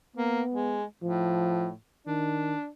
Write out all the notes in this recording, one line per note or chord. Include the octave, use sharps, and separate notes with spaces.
A#3 B3
G#3
A2 F3
D#3 D4